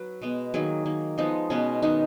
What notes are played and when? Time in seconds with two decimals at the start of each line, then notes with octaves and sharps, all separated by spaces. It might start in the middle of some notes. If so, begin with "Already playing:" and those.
Already playing: F#3 B4
0.22 B2 G#3 B3
0.54 D#3 F#3 A#3 G#4
0.86 D#3 A#3
1.18 F3 G#3 B3 D#4
1.50 B2 G#3 B3 C#4
1.82 D#3 G#3 B3 D#4